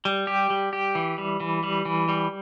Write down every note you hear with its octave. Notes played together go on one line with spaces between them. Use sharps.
G3
G4
G3
G4
E3
G3
E3
G3
E3
G3